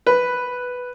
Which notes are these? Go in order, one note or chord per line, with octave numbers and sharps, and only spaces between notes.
B4